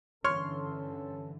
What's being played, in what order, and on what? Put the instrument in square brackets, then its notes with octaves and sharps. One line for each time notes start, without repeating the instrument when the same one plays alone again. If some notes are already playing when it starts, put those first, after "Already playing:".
[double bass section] G2 D3 E3 [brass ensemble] C#4 A4 [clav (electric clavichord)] C#5 [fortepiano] C6 F6